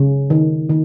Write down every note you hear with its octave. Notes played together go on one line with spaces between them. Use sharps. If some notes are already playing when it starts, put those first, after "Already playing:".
Already playing: C#3
D#3
D#3